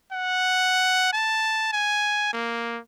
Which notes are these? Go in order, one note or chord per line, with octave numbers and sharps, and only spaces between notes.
F#5
A5
G#5
A#3